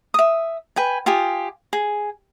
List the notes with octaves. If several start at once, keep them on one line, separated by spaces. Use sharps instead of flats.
E5 D#6
B4 G5 G#5
F4 G4 G#5 D#6
G#4